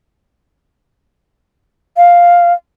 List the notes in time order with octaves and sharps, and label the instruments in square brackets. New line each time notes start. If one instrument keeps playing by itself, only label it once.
[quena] F5